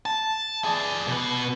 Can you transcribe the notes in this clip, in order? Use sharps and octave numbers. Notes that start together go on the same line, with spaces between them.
A5
G#4 D5
B2 B4